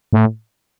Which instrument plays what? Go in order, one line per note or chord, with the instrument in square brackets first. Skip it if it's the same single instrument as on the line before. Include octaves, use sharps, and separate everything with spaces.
[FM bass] A2